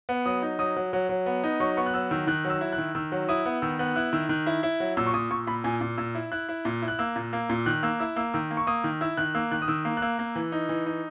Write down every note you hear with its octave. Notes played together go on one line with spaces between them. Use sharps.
B3
F#3 D#6
D#4
F#3 D#6
F#3
F#3
F#3
B3
D#4
F#3 C#6
B3 C#6
F#6
F#3 E6
D#3 E6
D#3 F#6
F#3
E6
E4
F#6
D#3
D#3 E6
F#3
E4 D#6
B3
D#3 E6
B3 F#6
E4 F#6
D#3 E6
D#3 F#6
E4
E4
F#3
A#2 E6
C#6
A#2 D#6
A#2 C#6
A#2 B5
A#2 G#5
A#2
A#2 E6
E4
E4 F#6
E4
A#2
E4
F#6
A#3 E6
A#2
A#3
A#2
D#3 F#6
A#3 E6
E4 E6
A#3 E6
D#3 E6
A#3
C#6
A#3 D#6
D#3
E4 E6
D#3 F#6
A#3 E6
D#3 F#6
D#6
D#3 E6
A#3
F#6
A#3 E6
A#3
E3
D#4
E3
D#4